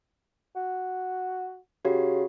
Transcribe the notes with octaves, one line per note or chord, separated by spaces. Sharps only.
F#4
C#3 F#4 G4